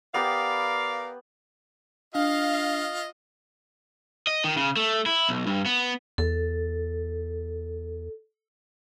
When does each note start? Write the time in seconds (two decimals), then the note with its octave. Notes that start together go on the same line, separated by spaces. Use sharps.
0.14 B3 G4 A#4 B4 D5 F5
2.15 D4 F4 D#5 F5
4.27 D#5
4.44 D#3
4.57 C#3
4.77 A3
5.06 E4
5.29 B1
5.47 G2
5.66 B3
6.18 E2 A4